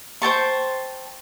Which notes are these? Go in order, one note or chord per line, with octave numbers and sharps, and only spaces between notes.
C5 G5 A5 C#6